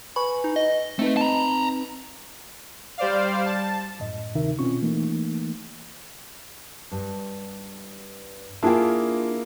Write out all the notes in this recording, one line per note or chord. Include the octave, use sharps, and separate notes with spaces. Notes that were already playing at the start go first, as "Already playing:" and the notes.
B4 G#5 B5 C#6
D#4
D#5
A3 C4 D#4 B4
A5 A#5
G3 C5 D5 F5
A5
F#2 A2 D#5
D2 C3 D#3 D#4 A#4 E5
B2 C4 C#4 F4 C#6
E3 A3 A#3 D#4
G2
A#3 D4 E4 F4 G#4 G5